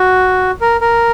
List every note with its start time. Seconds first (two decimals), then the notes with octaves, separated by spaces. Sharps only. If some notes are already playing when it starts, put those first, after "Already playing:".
Already playing: F#4
0.61 A#4
0.81 A#4